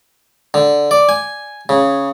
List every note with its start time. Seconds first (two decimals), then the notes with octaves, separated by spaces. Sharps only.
0.54 D3
0.91 D5
1.09 G#5
1.69 C#3